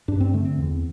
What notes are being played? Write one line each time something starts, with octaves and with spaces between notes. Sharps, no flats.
G2 D4
C4
D3 A3
C4
E2